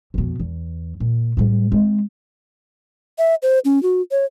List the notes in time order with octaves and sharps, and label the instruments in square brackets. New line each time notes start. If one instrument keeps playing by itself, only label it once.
[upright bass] F2 B2
E2
A#2
A2 G3
G#3 C4
[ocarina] E5
C5
C#4
F#4
C#5